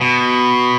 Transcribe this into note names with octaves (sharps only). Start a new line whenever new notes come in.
B2